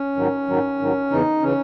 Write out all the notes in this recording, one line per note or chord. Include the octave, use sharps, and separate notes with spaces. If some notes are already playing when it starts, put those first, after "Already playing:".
Already playing: C#4
G#2 D#3 F#3
G#2 D#3 F#3
G#2 D#3 F#3
E2 C#3 E3 D#4
C#3 E3 C#4